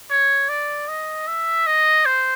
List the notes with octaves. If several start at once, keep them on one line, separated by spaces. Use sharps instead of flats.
C#5
D5
D#5
E5
D#5
C5